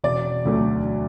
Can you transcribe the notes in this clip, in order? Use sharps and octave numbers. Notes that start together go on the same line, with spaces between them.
E1 D5
D2 D3 F#3 A3